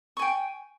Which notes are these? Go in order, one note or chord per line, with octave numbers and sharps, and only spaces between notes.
G5 G#5 C#6